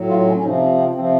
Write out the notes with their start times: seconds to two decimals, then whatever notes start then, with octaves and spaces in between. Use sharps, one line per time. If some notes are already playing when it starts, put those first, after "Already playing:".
Already playing: A2 F#3
0.09 F4
0.26 C#4
0.36 C#4
0.43 C3 F3 D#4
0.78 C4
0.95 C3 F3 C4